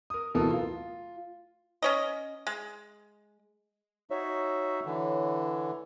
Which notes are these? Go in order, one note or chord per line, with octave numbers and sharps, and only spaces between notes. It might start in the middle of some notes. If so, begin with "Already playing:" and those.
A#4 D#6
D1 B2 E3 A4 A#4 D#6
F4
C#4 C#5 D#5
G#3
D#4 F#4 C#5 E5
D3 E3